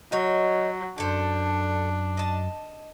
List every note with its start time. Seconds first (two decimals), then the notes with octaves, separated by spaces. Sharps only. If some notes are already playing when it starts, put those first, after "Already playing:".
0.12 F#3 D#4 C#5
0.98 F#2 D3 D4 A4 C5
2.17 D#5 A5